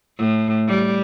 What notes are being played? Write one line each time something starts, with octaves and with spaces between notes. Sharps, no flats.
A2
G3